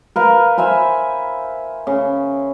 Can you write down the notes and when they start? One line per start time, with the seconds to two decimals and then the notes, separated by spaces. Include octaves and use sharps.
0.16 A#4 B4 F5
0.58 C5 E5 G#5 B5
1.87 C#3